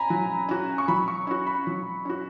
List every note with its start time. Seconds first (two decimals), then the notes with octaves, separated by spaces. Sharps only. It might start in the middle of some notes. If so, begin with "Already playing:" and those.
Already playing: G#5 A#5 B5
0.10 F#3
0.49 C#4 F#4
0.78 C#6
0.88 F#3 B5
1.08 C#6
1.27 C#4 F#4
1.47 B5
1.67 F#3
2.05 C#4 F#4